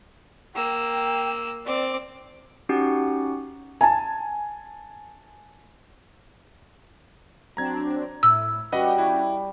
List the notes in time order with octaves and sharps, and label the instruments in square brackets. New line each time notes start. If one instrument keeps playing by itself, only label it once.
[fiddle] A#3 E6 [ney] G5
[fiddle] C4 D6 [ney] D5
[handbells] C#4 D#4 F#4 G4 F#5
[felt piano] G#5 A5
[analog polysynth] F#3 C4 D4 [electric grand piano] A#5 G#6
[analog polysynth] A2 E4 [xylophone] E6
[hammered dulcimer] G3 [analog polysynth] C#4 F#4 G4 [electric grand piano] B4 D#5 F#5
[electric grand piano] E4